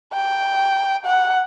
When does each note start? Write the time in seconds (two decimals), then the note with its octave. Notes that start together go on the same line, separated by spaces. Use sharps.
0.13 G5
1.05 F#5